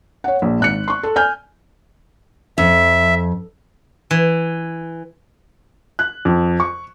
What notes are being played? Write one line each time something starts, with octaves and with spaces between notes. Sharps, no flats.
C#5 F#5
A#1
G#1 F#6 C#7
C6 C#6
A4
G#5 F6 G6
F2 E5
E3
F#6
F2
C#6